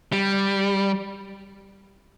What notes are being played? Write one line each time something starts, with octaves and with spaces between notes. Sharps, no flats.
G3